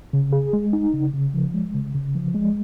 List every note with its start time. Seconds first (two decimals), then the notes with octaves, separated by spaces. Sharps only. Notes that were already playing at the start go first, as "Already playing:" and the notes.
0.13 C#3
0.33 G#4
0.53 G#3
0.73 D#4
0.93 C#3
1.14 C#3
1.34 F3
1.54 G#3
1.74 C#3
1.94 C#3
2.15 F3
2.34 G#3